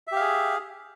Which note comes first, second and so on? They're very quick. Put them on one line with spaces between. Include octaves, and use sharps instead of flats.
E5 G4 F5 G#4